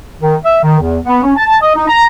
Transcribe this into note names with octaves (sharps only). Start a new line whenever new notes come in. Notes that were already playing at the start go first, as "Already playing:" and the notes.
D#3
E5
D#3
E2
B3
C#4
A5
D#5
D#4
A#5